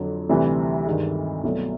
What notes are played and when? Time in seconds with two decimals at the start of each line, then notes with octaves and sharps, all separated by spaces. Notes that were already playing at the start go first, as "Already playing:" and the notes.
Already playing: F2 D3 F#3
0.30 D2 C3 E3 G3
0.86 G2 D#3 G#3
1.44 C2 B2 F#3 A3